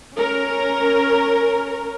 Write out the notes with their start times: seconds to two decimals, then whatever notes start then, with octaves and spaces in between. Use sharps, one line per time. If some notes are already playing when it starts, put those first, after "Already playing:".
0.17 C#4 A#4